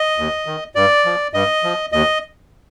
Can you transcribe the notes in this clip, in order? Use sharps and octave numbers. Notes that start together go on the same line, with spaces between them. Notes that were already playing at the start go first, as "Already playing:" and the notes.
Already playing: D#5
D#2
D#3
G2 D5
F3
G2 D#5
F3
D#2 D#5